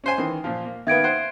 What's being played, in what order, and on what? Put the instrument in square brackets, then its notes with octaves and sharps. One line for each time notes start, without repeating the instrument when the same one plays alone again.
[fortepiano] C#4 C5 G#5
D#3 E3
A#2 F3
A#3
[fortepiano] D#3 A#3 B3 [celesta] E5 G#6 D7
[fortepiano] C5 F#5